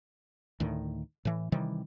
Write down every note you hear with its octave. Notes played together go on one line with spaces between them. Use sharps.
D2 A2 D#3
A2 E3
C3 D#3 E3 G3